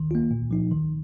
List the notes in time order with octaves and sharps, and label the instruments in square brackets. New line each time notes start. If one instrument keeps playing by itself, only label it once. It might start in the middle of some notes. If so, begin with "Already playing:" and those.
Already playing: [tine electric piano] D#3
A#3 F4
A#2
F3 D#4
D#3